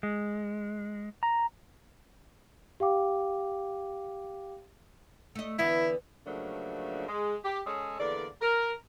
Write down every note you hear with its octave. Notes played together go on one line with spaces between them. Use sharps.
G#3
A#5
G4 F5 G5 D6
A3 D#5
D3 E3 B3 E4
C#3 F3 F#3 A3 A#3 D4
G#3
G4
G#3 C#4 G#4 A4 C#5
E2 D3 A#3 D5
A#4